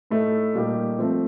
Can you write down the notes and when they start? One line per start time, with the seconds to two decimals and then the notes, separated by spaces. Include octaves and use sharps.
0.11 A2 A3 D#4 A4
0.55 A#2 G3 A#3 D#4 G4
0.99 F3 A3 C4